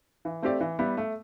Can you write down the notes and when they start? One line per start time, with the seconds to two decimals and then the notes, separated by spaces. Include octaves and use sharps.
0.25 E3
0.42 A3 C4 G4 D5
0.60 E3
0.79 G3 B3 E4
0.97 A3